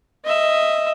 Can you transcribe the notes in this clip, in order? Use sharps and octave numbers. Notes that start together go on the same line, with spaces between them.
D#5 E5